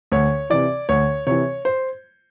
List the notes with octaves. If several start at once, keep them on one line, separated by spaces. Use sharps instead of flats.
D2 C#5
C3 E3 D5
D2 C#5
C3 E3 C#5
C5